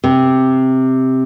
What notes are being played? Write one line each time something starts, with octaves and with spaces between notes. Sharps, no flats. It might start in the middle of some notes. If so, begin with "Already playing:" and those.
C3